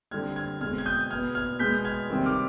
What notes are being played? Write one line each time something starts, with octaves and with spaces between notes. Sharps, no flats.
D3 G3 C4 F6 G#6
F6 G#6
B2 G#3 C4 F6 G#6
G#6
D#6 G6
B2 B3 F6 G#6
F6 G#6
B2 G#3 B3 G6 B6
F6 G#6
C3 D#3 G3 C4
D6 F6